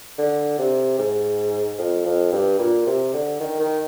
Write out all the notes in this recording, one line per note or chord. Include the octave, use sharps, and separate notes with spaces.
D3
C3
G#2
F2
F2
G2
A#2
C3
D3
D#3
D#3